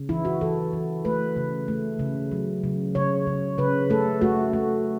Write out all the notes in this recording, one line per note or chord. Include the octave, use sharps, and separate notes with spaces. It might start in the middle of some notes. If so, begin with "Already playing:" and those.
Already playing: C#3
E3 E4
F#4
E3 A4
E3
A3 B4
C#3
A3
C#3
F#3
C#3
C#3 C#5
C#3
C#3 B4
A3 A4
A3 F#4
A3